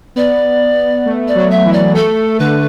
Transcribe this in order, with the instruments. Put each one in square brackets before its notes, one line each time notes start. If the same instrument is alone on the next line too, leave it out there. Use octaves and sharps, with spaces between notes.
[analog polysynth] B3 [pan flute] D5
[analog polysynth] A3
[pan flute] D5
[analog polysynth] F#3
[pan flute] E5
[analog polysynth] E3
[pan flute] D5
[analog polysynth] A3 [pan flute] A4
[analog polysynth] D3 [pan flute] B4